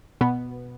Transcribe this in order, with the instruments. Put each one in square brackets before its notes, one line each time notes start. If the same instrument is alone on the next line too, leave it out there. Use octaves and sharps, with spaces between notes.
[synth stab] B2 B3